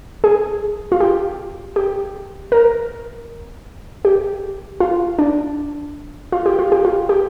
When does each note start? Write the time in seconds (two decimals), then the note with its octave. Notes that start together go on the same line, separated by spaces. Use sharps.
0.24 G#4
0.92 F4
1.00 G4
1.76 G4
2.52 A#4
4.05 G4
4.80 F4
5.19 D4
6.32 F4
6.46 G4
6.59 F4
6.72 G4
6.85 F4
7.09 G4